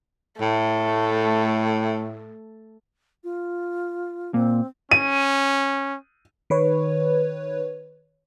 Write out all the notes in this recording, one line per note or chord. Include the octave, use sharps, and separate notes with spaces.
A2 A3
F4
A#2 C4
C#4 D#7
D#3 B4 C#5